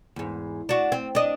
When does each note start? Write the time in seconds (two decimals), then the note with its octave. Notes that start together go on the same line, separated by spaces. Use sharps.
0.16 E2 G#2
0.69 D4 F#4
0.92 C4
1.15 D4 D#5